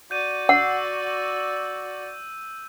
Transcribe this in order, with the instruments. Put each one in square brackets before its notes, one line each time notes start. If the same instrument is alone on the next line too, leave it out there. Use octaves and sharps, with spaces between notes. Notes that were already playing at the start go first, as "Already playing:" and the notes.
[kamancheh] F#4 D5 [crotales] G6 D#7
[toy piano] F#5 [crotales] E6